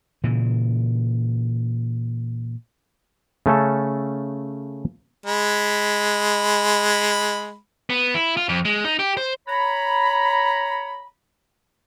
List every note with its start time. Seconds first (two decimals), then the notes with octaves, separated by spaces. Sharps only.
0.24 A#2 C#3 E3
3.46 C#3 A3 C#4 A4
5.26 G#3 B5
7.90 B3
8.14 E4
8.37 F4
8.49 F2
8.65 G#3
8.85 D#4
8.99 G4
9.17 C5
9.48 C#5 A#5 B5